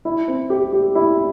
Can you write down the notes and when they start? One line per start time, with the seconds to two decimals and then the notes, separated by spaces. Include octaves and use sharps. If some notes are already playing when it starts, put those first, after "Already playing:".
0.05 E4
0.28 C4
0.50 G4
0.73 G4
0.95 E4